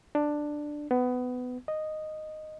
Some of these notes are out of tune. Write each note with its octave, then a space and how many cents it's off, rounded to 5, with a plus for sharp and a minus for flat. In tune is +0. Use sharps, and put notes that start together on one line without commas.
D4 +10
B3 +20
D#5 -5